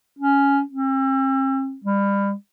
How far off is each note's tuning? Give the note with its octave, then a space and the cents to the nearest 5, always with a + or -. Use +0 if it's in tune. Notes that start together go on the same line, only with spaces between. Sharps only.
C#4 +5
C4 +45
G3 +30